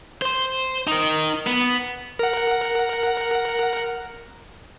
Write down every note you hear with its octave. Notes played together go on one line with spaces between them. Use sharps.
C5 C6
D#4 A#4
B3
A#4 F#5